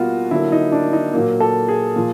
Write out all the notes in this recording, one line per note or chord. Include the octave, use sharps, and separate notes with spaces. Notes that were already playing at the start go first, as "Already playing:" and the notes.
Already playing: B2 G3 A#3 F4 F#4
D3 F#3 A#3 E4
D#4
D4
D#4
A#2 F#3 A#3
A4
G#4
A#2 F3